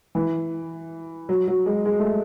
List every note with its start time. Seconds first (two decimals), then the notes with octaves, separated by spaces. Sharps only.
0.15 E3
1.29 F#3
1.48 F#3
1.66 G#3
1.86 G#3
2.00 A3